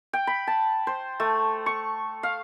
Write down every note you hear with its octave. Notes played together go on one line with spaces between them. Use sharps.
G5
B5
A5
C5
A3
C#6
F5